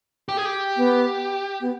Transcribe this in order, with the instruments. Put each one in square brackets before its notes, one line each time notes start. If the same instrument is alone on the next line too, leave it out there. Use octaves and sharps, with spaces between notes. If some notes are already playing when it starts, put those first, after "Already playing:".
[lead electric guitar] G4
G#4
G4
[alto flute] B3
B3